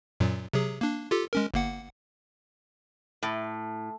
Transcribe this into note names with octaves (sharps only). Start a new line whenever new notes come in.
F#2 A#2 F#3
C3 F#3 G#4
A#3 D4
F4 G4 A4
G#3 C#4 A#4
G1 A#3 F#5
A2